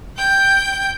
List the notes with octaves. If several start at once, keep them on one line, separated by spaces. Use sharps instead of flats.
G5 G6